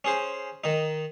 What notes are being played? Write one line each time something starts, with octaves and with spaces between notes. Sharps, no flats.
C#4 G#4 C5
D#3 D#4